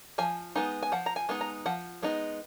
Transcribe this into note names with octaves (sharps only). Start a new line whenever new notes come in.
F3 G#5
G#3 B3 D#4 G#5
G#5
F3 F#5
A#5
G#5
G#3 B3 D#4
A#5
F3 F#5
G#3 B3 D#4